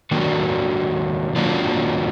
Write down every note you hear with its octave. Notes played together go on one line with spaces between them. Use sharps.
D#3 F#3 A#3 D4 F#4
D#3 F#3 A#3 D4 F4